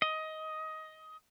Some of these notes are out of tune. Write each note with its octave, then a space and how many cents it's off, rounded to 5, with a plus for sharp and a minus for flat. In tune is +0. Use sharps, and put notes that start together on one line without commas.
D#5 +15